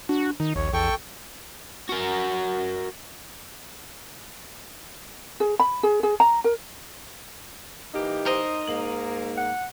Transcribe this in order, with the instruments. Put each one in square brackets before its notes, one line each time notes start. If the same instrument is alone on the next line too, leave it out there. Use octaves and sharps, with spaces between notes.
[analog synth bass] D4 [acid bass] F#4
[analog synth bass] D#3 [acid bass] D#4
[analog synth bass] A#1 [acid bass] D#2 [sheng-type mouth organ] C#5
[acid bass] E2 [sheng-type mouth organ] A4 G5 C#6
[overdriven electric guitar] F#4 A#4
[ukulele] G#4
B5
G#4
G#4
A#5
A#4
[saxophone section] E3 A#3 G4 [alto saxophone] D#4
[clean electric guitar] A#4 D#5 [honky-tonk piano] C5
[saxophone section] G#2 A#3 [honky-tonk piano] F#7
[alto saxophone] F#5